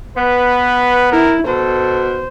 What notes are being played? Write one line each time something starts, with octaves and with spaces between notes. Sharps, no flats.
B3 B4
E4 A#4
B2 A4 C5